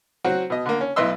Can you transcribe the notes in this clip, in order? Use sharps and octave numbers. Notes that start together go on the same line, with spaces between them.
F#3 C4 F#4
B2 D#5
D3 A#3
C#4
B1 E4 B4 D#5 C6 E6